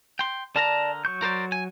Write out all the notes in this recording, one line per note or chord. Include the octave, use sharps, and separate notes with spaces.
G5 C6
D3 A#4 D5 A5 A#5
F#3 C#6 G6
A#4 C5 D5
G#5